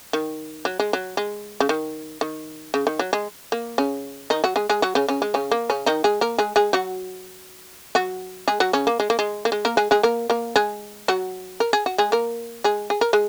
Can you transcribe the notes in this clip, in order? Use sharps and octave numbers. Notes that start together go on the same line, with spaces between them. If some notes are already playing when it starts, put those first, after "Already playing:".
D#3
F#3
G#3
F#3
G#3
C#3
D#3
D#3
C#3
D#3
F#3
G#3
A#3
C#3 C#4
D#3 D#4
F#3 F#4
G#3 G#4
G#3 G#4
F#3 F#4
C#3 C#4
C#3 C#4
G#3
C#3 C#4
A#3
C#3 C#4
D#3 D#4
G#3 G#4
A#3 A#4
G#3 G#4
G#3 G#4
F#3 F#4
F#3 F#4
G#3 G#4
F#3 F#4
C#3 C#4
A#3
G#3
A#3
G#3
A#3
G#3
A#3 A#4
G#3 G#4
G#3 G#4
A#3 A#4
A#3 A#4
G#3 G#4
F#3 F#4
A#4
G#4
F#4
G#3 G#4
A#3 A#4
G#3 G#4
G#4
A#4
G#3 G#4